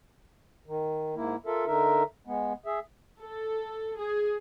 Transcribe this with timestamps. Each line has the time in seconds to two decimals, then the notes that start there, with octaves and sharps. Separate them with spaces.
0.67 D#3
1.15 G#2 A#3 E4
1.46 F4 A4 A#4 E5
1.66 D3 D#4 A#4 E5
2.27 G#3 B3
2.66 G#4 E5
3.19 A4
3.99 G#4